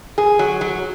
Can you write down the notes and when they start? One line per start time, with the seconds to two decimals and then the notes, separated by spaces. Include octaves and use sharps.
0.18 G#4
0.39 F#3
0.61 F#3